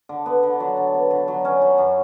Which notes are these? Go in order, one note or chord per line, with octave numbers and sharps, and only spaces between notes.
D3
B3
D3
F#3
D3
B3
D3
F#3
C#4
F#3
F#2